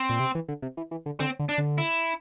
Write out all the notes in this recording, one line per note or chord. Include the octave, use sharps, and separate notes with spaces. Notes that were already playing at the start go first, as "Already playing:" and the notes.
Already playing: C4
A#2
C3
E3
D3
C3
E3
E3
D3
D3 C4
D3
D4
D3
E4